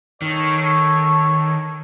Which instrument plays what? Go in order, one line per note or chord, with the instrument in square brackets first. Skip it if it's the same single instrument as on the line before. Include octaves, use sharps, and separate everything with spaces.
[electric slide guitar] D#3 [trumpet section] A4 C#5